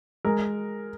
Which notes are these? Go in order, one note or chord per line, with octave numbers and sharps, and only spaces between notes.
G#3 A#4